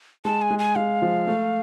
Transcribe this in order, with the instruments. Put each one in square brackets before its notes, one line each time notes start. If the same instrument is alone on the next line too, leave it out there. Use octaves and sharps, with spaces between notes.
[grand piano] G#3 [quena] A5
[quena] G#5
[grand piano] G#3
[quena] G#5
[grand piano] G#3 [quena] F5
[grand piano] F3
A3